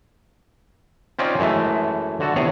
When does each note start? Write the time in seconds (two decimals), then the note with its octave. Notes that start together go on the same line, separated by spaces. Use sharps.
1.19 C4 C#4 D#4 F4 D5
1.39 F#2 E3 G#3 A3
2.20 D3 F#4 A4
2.36 E2 C3 G#4 C#5